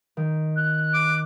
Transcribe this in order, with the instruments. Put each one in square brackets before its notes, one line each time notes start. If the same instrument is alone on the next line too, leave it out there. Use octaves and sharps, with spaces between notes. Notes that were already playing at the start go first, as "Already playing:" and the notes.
[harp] D#3
[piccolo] F#6
[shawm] D6